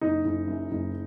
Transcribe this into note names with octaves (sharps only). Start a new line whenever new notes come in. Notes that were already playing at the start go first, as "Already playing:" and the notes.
F#1 D#4
F#1
F#2
F#1